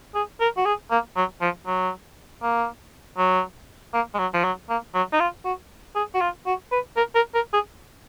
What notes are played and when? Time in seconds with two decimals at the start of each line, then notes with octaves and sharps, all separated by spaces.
0.15 G#4
0.41 A#4
0.57 F#4
0.66 G#4
0.91 A#3
1.17 F#3
1.41 F3
1.67 F#3
2.42 A#3
3.18 F#3
3.94 A#3
4.14 G#3
4.19 F#3
4.34 F3
4.44 F#3
4.70 A#3
4.95 F#3
5.13 D#4
5.20 F4
5.45 F#4
5.95 G#4
6.14 F#4
6.21 F4
6.46 F#4
6.72 B4
6.97 A#4
7.15 A#4
7.35 A#4
7.53 G#4